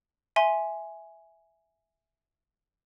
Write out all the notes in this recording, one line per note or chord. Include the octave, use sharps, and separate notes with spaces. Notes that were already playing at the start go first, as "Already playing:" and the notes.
E5 G#5 C6